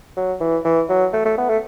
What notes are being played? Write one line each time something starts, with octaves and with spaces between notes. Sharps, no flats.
F#3
E3
E3
F#3
A3
A3
B3
A3